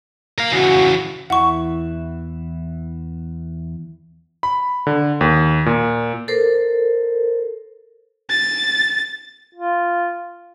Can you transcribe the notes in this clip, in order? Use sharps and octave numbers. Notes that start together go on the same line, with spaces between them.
A#4 F5
C#3 E3 F#4
E2 E3 E4 F#5 C#6
B5
D3
D#2
A#2
A4 A#4 C5
A6
F4